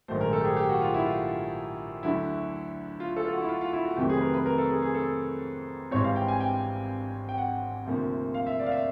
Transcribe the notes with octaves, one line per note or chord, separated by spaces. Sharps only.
A#1 G#2 D#3 F#3 A3 C5
A#4
A4
G4
G#4
G4
F#4
F4
E4
F4
D2 D3 F#3 E4
F4
A4
F4
F#4
E4
F4
F4
E4
F#4
F2 C3 D#3 F#3 A3 G4
G#4
B4
A#4
B4
A#4
A4
G#4
G#4
A4
G#1 G#2 E3 G3 C4 C#5
F5
G5
G#5
G5
G5
F#5
D2 C3 F3 A#3
F5
E5
D5
F5
E5